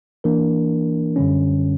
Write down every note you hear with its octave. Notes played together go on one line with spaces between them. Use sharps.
E3 A#3 D4 A#4
F#2 D3 G3 C#4